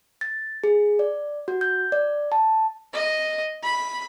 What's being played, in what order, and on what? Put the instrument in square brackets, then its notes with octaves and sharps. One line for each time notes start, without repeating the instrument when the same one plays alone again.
[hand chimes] A6
G#4
D5
F#4
G6
D5
A5
[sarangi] D#5
B5